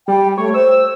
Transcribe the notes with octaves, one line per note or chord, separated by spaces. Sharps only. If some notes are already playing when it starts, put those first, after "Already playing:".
G3 G5
A3 C#5
C5 E6